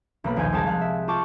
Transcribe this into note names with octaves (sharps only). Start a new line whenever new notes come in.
B1 A#3 B5
A#1 D#2 G5 G#5
F1 C2 G3 G#3 A5 G#6
F5 F#6
E5
F4 G4 A5 C#6 D6